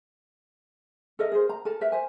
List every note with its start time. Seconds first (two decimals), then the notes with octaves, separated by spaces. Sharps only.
1.19 A4 A#4 D#5 E5
1.32 G#4 A#4 C5
1.49 A#5
1.65 A4 A#4 A5
1.81 A#4 B4 E5
1.92 C5 G#5